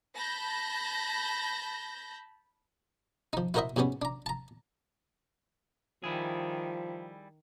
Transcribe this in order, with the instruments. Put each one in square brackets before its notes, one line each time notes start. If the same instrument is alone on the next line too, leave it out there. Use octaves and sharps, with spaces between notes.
[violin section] A5 B5 G6 A#6
[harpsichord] F3 D#4
E4 F#4 A#4 C5 D#5 E5
G#2 B2 G3 B3 C#4
D4 A#5
A5 A#5
[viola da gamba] D#3 [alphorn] F3 [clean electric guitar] G3 E4 G#4